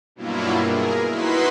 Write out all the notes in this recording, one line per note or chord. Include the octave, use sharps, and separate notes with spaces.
G2 B2 F#3 A#3 E4 F4
G#4 A#4
D#4 E4 F#4 B4 C6 B6